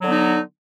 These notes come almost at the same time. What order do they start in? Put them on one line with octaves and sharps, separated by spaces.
F#3 D3 B3 D#4